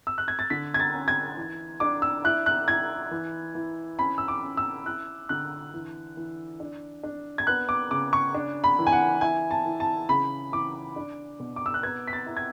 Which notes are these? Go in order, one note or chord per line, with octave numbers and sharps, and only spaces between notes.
E6
F#6
G#6
A6
D3 B6
G#6
A6
C#4
G#6
E3
D4 D6
E6
E4 F#6
F#6
E4 G#6
E3
E3
C#4 B5
E6
D6
C#4
E6
E4 F#6
D3 F#6
E3
E3
D4
D4
G#6
B3 F#6
D6
C#3 D6
C#6
D4
B5
E3
G#5
F#5
E4 G#5
A5
E3
A5
C#3 B5
E3 D6
D4
B2
D6
E6
F#6
B3 G#6
B6
A6
E4
G#6